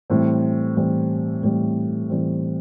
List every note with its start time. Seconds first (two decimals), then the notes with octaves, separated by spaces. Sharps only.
0.10 A2 E3 G3 C4
0.77 A2 E3 G3 C4
1.43 A2 E3 G3 C4
2.10 A2 E3 G3 C4